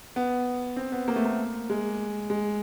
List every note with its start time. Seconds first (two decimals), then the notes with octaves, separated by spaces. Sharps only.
0.16 B3
0.76 C4
0.92 B3
1.08 A#3
1.16 A3
1.25 A#3
1.70 G#3
2.30 G#3